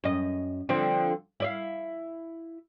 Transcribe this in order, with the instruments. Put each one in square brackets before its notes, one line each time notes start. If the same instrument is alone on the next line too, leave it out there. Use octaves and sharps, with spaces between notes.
[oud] F#2 D#5
D3 F3 C4
E4 D5 F5